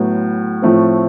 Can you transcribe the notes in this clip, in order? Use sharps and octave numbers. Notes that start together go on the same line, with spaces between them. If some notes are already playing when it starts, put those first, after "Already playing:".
Already playing: A2 F#3 B3
A2 F3 A3 C4